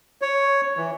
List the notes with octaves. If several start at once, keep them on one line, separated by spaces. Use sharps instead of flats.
C#5
E3